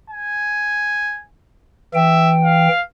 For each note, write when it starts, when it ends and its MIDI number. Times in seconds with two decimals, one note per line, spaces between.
0.10 1.21 80
1.94 2.68 52
1.94 2.34 76
1.94 2.68 79
2.44 2.81 77